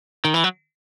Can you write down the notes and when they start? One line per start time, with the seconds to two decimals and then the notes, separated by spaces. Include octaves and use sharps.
0.25 D#3
0.34 E3
0.44 F#3